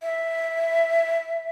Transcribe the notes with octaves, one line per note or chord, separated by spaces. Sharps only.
E5